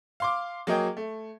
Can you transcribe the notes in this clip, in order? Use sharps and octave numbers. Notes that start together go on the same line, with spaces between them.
F5 C6 D6
F#3 A#3 G#4 D#5 G5
A3